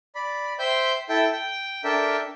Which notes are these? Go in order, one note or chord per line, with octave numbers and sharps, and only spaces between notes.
D5 B5
C5 E5 G5 C6 G6
E4 A4 G5
G5
D4 A4 A#4 E5 G5